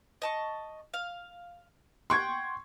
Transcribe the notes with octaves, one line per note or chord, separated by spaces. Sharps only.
D#5 A5 C#6
F5
F#5 G5 C6 C#6 G#6